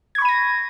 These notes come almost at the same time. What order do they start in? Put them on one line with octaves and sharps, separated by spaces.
G#6 C#6 B5 D#7 A#6